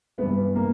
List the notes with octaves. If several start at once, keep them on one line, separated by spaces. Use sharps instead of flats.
G2 E3 B3
A#3